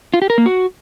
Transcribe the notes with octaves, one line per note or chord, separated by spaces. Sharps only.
F4
G4
A#4
A#3
F#4